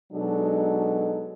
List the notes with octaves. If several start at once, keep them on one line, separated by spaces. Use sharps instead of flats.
B2 F#3 G#3 D4 D#4 A4